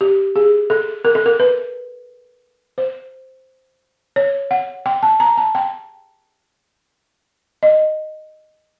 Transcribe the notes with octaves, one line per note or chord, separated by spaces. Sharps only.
G4
G#4
A4
A#4
A4
A#4
B4
C5
C#5
F#5
G5
A5
A#5
A5
G5
D#5